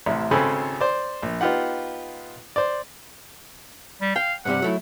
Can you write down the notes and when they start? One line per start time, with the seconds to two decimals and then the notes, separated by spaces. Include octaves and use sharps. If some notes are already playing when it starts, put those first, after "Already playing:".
0.06 A1 C3 E4
0.31 G#1 C#3 C4 A4 G#5 B5
0.81 C5 D5
1.23 A#1
1.41 B3 D#4 F4 G4 F#5
2.56 C5 D5
4.01 G3
4.16 F5 G5
4.45 G2 C3 G3 F#5
4.62 F#3 A3 E4